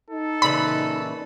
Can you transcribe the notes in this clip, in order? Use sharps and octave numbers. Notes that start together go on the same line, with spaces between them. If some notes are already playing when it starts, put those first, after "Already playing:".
D#4 A4
A#2 C#3 E3 B5